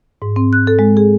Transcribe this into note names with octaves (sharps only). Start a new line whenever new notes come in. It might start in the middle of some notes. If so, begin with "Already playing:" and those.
G#2
C4
F#6
A4
G#3
G#4